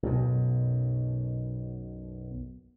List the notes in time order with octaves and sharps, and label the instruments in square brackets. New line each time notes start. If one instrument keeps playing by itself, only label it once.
[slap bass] B1 F#2 [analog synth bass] B2